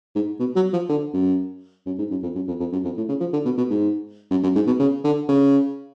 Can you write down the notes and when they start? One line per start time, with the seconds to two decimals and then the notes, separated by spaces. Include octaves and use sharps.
0.15 G#2
0.40 B2
0.56 F#3
0.73 F3
0.89 D3
1.14 F#2
1.86 F#2
1.99 G#2
2.11 F#2
2.23 F2
2.35 F#2
2.48 F2
2.60 F2
2.73 F#2
2.84 F2
2.97 A2
3.09 C#3
3.21 F3
3.33 D3
3.45 B2
3.58 B2
3.70 G#2
4.31 F#2
4.43 F#2
4.55 G#2
4.67 B2
4.79 C#3
5.04 D3
5.29 C#3